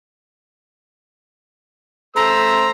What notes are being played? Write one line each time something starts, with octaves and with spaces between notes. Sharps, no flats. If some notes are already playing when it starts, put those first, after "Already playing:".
A3 C5 A#5 E6